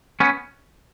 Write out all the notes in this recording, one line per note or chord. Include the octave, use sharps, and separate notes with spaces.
B3 C#4